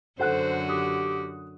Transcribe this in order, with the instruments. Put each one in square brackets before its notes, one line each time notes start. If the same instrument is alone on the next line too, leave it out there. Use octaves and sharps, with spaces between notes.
[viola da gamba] F#2 D3 F#4 [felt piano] A4 F#5 F#6 [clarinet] C5
[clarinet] G4 [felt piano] D#6